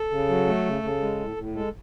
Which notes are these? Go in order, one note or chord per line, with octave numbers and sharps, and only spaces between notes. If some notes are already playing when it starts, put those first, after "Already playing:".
Already playing: A4
C#3
F#3
A3
C#3
C#3
G#3
A2
A2
G#3 A4